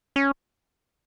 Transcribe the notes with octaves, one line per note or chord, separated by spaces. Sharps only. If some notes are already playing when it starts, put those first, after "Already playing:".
C#4